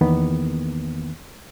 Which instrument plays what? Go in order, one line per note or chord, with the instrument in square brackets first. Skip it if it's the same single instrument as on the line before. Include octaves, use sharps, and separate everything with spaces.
[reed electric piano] E2 D#3 A#3 B3